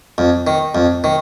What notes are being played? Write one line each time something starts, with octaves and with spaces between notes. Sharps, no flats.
F2
D#3
F2
D#3